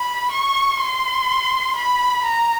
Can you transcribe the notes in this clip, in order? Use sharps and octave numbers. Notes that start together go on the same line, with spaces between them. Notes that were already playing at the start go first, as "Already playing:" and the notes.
Already playing: B5
C#6
C6
B5
A#5